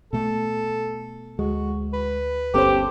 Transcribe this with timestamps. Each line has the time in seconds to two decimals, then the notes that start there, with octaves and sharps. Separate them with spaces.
0.13 B2 A3 A4
1.39 D2 G#3 F#4
1.93 B4
2.54 G1 B3 C#4 G4 A4 C5